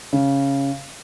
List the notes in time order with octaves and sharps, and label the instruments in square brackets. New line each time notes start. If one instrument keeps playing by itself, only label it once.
[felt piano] C#3